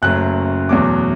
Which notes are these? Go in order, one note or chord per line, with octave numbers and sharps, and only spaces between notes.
F#1 F#2 F#3 A3 F#6
E2 B2 F#3 A3 D6